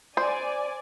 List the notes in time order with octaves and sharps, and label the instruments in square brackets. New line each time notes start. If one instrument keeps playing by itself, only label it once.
[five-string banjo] C5 [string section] D5 G#5